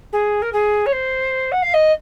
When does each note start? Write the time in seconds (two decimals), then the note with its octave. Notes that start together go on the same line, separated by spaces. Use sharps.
0.12 G#4
0.42 A#4
0.53 G#4
0.86 C#5
0.92 C5
1.52 F#5
1.62 F5
1.74 D#5